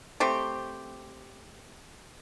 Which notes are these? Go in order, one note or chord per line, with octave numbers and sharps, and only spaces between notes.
A3 C4 G4